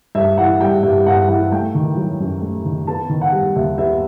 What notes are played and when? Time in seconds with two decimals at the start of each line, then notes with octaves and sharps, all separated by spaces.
0.15 G2 E5
0.38 E3 F#5
0.61 G3 G5
0.83 G2 E5
1.07 G2 F#5
1.28 E3 F#5
1.52 A3 G5
1.75 D#3
1.97 F#3
2.20 F#2
2.42 A3
2.65 D#3
2.87 B3 A5
3.09 D#3
3.21 F#5
3.32 G3
3.56 D#2 E5
3.78 B3 E5